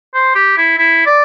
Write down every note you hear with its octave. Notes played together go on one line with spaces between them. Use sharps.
C5
G4
E4
E4
D5